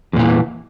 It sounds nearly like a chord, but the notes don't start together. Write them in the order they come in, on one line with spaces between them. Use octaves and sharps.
E2 A#2 E3